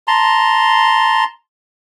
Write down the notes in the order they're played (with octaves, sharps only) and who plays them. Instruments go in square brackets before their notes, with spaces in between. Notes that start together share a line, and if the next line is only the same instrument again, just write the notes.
[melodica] A5 A#5 C6